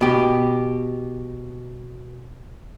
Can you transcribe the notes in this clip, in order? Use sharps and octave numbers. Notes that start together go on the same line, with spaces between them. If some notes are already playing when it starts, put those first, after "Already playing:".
B2 G4